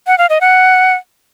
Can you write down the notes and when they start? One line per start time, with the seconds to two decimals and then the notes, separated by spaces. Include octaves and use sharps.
0.07 F#5
0.18 F5
0.30 D#5
0.41 F#5